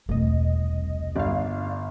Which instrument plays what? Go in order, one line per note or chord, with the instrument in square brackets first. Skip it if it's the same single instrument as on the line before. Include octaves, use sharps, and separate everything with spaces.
[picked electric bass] E1 [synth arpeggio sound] C2 D#5 [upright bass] A3
[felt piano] G1 [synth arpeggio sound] D5 F5